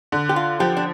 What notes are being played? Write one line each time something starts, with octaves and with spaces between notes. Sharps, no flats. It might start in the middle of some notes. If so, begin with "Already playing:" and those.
D3
G4
F4
F3 G4
D4